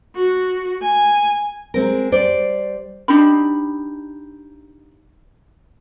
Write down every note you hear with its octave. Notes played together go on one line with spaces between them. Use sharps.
F#4
G#5
G#3 C4 A#4
G3 C5 D5
D4 D#4 G4 B5